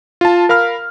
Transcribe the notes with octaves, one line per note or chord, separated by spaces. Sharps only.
F4 A5
A#4 F5 B5 F6